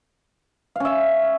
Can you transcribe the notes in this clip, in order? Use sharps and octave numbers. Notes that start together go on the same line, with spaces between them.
C#4 E5 F5